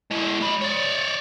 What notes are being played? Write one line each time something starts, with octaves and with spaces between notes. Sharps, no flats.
G#3 E4
G#3 B5
C#5 D5